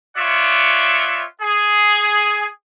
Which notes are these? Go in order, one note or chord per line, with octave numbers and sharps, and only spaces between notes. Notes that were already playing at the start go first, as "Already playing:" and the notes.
F4 C#5 D5 E5 F#5
G#4